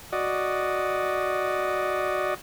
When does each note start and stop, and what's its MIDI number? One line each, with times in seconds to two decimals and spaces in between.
0.13 2.34 66
0.13 2.34 74
0.13 2.34 75